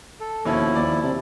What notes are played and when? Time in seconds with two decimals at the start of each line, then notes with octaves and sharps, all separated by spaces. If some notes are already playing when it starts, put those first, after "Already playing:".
0.20 A4
0.45 D#2 B2 F3 C#4 E4 C#5
0.75 D#2 D5
1.03 C3